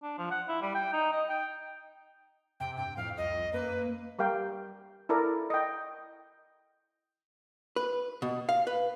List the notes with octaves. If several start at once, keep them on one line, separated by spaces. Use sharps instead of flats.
D4
F3
F#5
E4
G3
G5
D#4
D#5
G5
F2 C3 G5
G2 G5
F2 A2 F5
C2 F2 D#5
F#2 A#3 B4
G3 G4 A#4 F5 G5
E4 A4 A#4 D5
D#5 G5
B4
B2
F5
B4